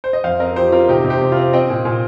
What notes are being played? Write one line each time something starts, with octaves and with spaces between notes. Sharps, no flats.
C5
D#5
F2 C5 F5
C4 A#4 D#5
F3 G4 C5
C4 F4 A#4
C3 D#4 G4
C3
G4 C5
C3
C4 F4
C4 D#5 G5
A#2
A#2